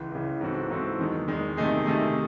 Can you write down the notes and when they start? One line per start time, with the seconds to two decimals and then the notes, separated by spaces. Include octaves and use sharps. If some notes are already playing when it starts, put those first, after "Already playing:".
Already playing: C#2 E3
0.12 C#2 C#3 E3
0.41 G#2 E3 C4 F#4 A4
0.70 G#2 E3 C4 F#4 A4
0.99 E2 D#3 G#3
1.28 E2 D#3 G#3
1.57 C3 D#3 A3 D#4 G#4
1.86 C3 D#3 A3 D#4 G#4